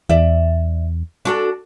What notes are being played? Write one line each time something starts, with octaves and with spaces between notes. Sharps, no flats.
E2 D5 E5
D4 F#4 A4